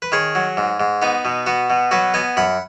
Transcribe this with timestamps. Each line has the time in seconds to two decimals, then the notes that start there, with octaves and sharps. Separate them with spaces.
0.02 B4
0.12 D#3 G#4 C#5
0.35 F#3
0.57 G#2
0.80 G#2
1.02 B3 D#4
1.25 B2
1.46 B3 F#4
1.70 B2
1.91 F#3 F#4 B4
2.14 B3 D#5 G#5
2.37 F#2 F#5 B5